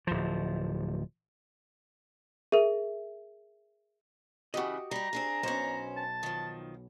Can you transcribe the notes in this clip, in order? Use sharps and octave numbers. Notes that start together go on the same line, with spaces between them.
D1 F3
G#4 A#4 E5
C#3 E3 F#4 G4 D#5
G3 D#4 A#5
C4 D4 G#4
B1 B2 C#4 C5
A5
D#3 F3